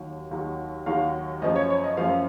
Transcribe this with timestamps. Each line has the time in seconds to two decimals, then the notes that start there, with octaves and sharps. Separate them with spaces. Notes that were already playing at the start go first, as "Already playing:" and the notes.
Already playing: D#2 D#3 F#3
0.31 D#2 D#3 F#3
0.86 D#2 D#3 F#3 F5
1.42 F#2 F3 D#5
1.56 C#5
1.70 C#5
1.84 D#5
1.97 F#2 F3 F5